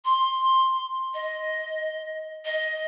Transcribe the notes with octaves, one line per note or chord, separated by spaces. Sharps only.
C6
D#5
D#5